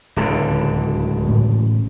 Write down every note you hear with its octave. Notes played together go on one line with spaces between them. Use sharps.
D1 C#2 D3
A1 A2 C#3